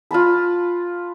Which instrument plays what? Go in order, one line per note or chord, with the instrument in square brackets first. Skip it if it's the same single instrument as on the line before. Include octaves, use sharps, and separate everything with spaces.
[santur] F4 B4 A5 B5